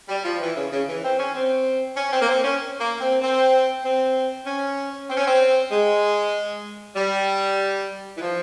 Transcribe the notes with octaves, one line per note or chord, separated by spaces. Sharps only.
G3
F3
E3
C#3
C#3
E3
C4
C#4
C4
C#4
C4
A#3
C4
C#4
A#3
C4
C4
C4
C#4
C4
C#4
C4
G#3
G3
E3
F3